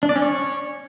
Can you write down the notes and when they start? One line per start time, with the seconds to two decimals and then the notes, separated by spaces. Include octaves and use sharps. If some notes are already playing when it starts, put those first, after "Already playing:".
0.03 D4
0.09 D5
0.16 C#4
0.22 C#5